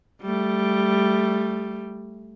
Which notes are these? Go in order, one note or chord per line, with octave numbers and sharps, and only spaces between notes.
G3 A3